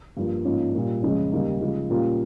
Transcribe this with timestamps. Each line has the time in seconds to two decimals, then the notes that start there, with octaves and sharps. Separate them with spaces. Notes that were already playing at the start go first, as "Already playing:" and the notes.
0.17 G2 F3 A#3
0.45 G#2 F3 A#3 C#4 F4
0.74 A#2 G3 A#3
1.03 F2 C#3 G#3 C#4
1.32 D#2 C#3 G3 A#3 D#4
1.61 C#3 F3 G#3
1.90 A#2 G3 A#3 C#4 F4